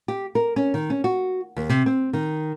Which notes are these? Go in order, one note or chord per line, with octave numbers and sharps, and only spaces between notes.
G4
A#4
C#4
D#3
C#4
F#4
D#2
C3
C4
D#3